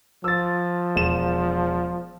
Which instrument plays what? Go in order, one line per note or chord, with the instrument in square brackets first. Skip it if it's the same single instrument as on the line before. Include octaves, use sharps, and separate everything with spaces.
[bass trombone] F3 [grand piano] E6 A6
[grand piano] E1 E7